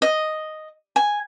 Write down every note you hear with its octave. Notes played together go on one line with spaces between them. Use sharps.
D#5
G#5